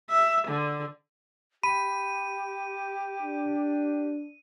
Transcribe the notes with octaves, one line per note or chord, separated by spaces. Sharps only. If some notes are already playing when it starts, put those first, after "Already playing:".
E5
D3
G4 B5 D#7
D4